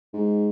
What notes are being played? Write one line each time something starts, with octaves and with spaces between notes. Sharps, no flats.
G#2